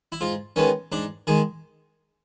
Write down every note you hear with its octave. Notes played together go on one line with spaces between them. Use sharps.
E4
G#2 F4
D#3 G#3 B3 C#4
G#2 D4
D#3 G#3 G#4